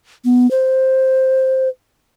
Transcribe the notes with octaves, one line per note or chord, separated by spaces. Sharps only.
B3
C5